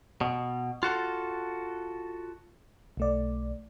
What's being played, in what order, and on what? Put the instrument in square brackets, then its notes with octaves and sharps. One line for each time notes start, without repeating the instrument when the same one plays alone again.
[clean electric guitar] B2
F4 F#4 A4
[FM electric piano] B1 A3 D5